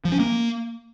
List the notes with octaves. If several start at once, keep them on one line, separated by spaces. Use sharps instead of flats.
F3
C#4
A#3